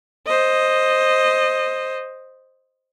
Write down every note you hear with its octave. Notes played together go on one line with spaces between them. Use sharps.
C5 D#5